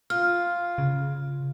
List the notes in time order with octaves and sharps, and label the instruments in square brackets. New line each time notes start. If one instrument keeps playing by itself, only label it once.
[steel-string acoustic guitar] F4 [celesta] F6
[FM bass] C#3